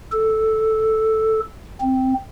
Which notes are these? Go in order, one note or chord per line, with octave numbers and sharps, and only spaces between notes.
A4
C4